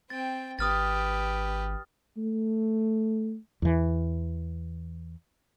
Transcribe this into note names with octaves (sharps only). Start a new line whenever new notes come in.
C4 G5 A6
G#1 G4 B4 D#6 F6 A6
A3
E2 E3